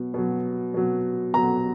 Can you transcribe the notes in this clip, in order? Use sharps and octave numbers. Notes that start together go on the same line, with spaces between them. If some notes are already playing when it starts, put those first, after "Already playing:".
Already playing: B2 F#3
B2 F#3
B2 F#3
B2 F#3 A#5